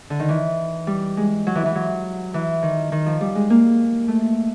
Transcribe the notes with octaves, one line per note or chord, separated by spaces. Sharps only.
D3
D#3
E3
G3
G#3
F#3
E3
E3
F#3
E3
D#3
D#3
F3
G3
G#3
A#3
A3